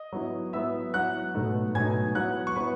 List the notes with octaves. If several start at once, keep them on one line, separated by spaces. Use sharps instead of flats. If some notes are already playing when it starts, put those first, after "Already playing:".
Already playing: D#5 D#6
F#3 B3 E4
F#3 B3 E4 E5 E6
F#3 B3 E4 F#5 F#6
B2 F#3 A3 D#4
B2 F#3 A3 D#4 G#5 G#6
F#3 B3 E4 F#5 F#6
C#6
F#3 B3 E4 B4 B5